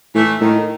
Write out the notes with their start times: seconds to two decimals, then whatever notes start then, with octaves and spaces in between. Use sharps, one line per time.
0.14 A2 E3 A3
0.40 A2 D#3